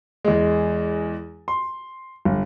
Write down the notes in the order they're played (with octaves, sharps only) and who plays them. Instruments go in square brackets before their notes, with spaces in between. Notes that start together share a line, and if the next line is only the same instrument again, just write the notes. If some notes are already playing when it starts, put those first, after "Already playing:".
[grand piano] E2 G#3
C6
G1